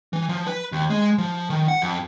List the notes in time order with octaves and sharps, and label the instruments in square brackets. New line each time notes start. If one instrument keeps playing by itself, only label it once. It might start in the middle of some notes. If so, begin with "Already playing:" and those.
[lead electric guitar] E3
F3
B4
D#2
G#3
F3
D#3
F#5
F2